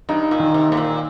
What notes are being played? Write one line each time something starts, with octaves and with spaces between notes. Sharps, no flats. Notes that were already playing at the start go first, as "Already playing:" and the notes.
G2 D#4
A#2
D#3
C3
G#2 A#3
A#2